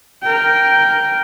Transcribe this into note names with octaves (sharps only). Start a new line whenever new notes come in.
A#4 G5